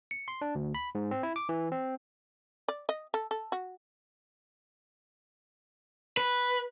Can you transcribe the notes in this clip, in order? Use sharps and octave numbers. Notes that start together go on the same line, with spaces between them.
C#7
C6
D4
D2
B5
G#2
C4
E4
D6
E3
C4
D5
D#5
A4
A4
F#4
B4